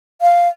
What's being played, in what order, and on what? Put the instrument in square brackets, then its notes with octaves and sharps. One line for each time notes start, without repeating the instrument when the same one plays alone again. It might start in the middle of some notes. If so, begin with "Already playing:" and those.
[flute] F5